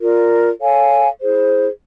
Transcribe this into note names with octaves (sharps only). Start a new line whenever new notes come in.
F4 A#4 D5
A4 C#5 F5 G#5
E4 G#4 C5